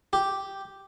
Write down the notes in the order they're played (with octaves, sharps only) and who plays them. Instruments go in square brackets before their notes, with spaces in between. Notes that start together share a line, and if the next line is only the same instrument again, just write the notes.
[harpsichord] G4